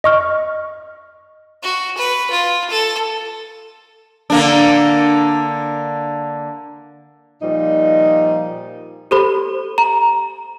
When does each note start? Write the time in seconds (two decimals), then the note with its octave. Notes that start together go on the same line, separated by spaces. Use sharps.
0.04 D#5 C#6 F6
1.62 F#4
1.97 B4
2.30 F4
2.70 A4
4.30 D3 A#3 D4
7.42 A#2 F3 G3 D#4
9.11 G4 A4 C5 B5
9.78 A#5